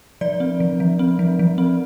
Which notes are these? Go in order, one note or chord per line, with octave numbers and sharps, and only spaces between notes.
F3 D5
C4
F3
F3
C4
F3
F3
C4